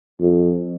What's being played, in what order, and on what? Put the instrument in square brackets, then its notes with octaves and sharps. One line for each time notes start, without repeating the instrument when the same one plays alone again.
[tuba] F2